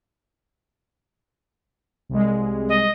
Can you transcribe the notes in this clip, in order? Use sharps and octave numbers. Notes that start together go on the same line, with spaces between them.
C2 G#3
D#5